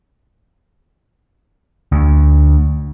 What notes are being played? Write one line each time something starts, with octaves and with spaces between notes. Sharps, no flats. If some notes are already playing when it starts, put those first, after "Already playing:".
D2